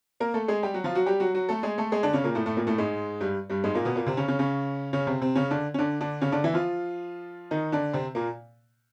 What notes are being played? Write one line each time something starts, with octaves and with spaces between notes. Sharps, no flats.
A#3 A#4
A3 A4
G#3 G#4
G3 G4
F#3 F#4
F3 F4
F#3 F#4
G3 G4
F#3 F#4
F#3 F#4
A3 A4
G#3 G#4
A3 A4
G#3 G#4
D3 D4
C#3 C#4
A#2 A#3
A2 A3
A2 A3
A#2 A#3
A2 A3
G#2 G#3
G2 G3
G2 G3
G#2 G#3
A#2 A#3
B2 B3
A#2 A#3
C3 C4
C#3 C#4
C#3 C#4
C#3 C#4
C#3 C#4
C3 C4
C3 C4
C#3 C#4
D3 D4
C#4
D3 D4
D3 D4
C#3 C#4
D3 D4
E3 E4
F3 F4
D#3 D#4
D3 D4
C3 C4
A#2 A#3